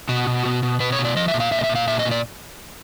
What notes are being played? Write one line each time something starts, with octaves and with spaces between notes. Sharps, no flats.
B2 F#4
B2
B2
B2
B2 B4
C#5
B2
D5
F3 D#5
E5
A#2
F5
A#2 E5
D#5
E5
A#2
F5
A#2 E5
D#5
A#2
D5